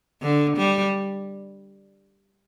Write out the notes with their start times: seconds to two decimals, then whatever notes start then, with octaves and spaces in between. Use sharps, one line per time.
0.22 D3
0.58 G3